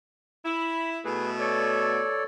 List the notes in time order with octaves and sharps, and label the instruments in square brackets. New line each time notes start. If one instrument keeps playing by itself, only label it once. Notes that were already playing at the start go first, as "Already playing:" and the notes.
[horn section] E4 [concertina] B5
[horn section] B2 A3 [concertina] G#4 B4
[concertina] A4 C#5 D5